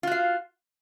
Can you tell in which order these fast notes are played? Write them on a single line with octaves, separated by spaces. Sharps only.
F4 F#4 F5